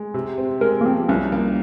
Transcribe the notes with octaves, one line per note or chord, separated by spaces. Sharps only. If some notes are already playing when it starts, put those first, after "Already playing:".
Already playing: G#3
C3
C4
G#3 A#4
A#3
F3 C4
C2 C#4
A#3